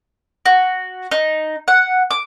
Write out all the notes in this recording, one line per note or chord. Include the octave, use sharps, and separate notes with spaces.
F#4
D#4
F#5
D6